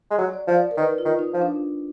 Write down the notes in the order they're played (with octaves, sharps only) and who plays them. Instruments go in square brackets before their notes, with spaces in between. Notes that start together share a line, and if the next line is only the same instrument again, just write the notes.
[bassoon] G#3
F#3
[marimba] D5
[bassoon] F3
[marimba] D5
A#4
[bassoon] D#3 [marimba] B4
[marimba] F4
[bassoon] D#3
[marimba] D#4
[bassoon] F3
[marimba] D4